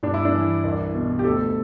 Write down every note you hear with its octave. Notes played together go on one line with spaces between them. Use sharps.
G2 D4
E4
D4
E3
C2
B2
G4
D2 A4